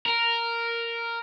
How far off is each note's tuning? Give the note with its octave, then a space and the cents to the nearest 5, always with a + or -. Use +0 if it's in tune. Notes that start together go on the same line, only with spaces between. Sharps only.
A#4 -5